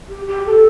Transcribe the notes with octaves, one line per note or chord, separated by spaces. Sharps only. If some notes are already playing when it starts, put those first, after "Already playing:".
G4
G4
A4